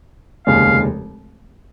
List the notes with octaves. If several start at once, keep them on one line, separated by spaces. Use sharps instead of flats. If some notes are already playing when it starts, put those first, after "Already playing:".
F1 D#2 C#3 G#3 F5